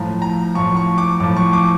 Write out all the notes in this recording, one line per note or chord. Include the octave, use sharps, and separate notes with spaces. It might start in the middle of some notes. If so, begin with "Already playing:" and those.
Already playing: A2 F3 A#5
A#5
A2 F3 C#6
C#6
D6
A2 F3 D6
C#6
D6